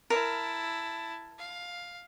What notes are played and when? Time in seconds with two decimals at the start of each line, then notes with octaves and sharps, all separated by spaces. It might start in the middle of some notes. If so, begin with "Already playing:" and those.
0.10 E4 A#4 A5
1.38 F5